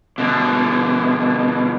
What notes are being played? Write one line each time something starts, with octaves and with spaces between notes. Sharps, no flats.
B2 D3